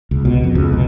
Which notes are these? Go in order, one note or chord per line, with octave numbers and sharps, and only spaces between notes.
C#2
B2
F2
C#2
B2